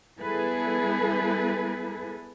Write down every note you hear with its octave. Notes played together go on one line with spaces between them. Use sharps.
G3 B3 E4 G#4 A4 B4